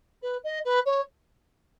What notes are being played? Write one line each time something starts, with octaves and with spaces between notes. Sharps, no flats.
B4
D#5
B4
C#5